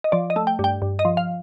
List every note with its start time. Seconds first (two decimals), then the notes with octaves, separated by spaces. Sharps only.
0.04 D#5
0.12 F3 D5
0.30 D#5
0.36 A3
0.47 G5
0.59 G2
0.64 G5
0.82 G2
0.99 D#5
1.05 F3
1.17 F5